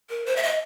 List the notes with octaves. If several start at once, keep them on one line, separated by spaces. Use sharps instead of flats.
A#4
C5
E5
D#5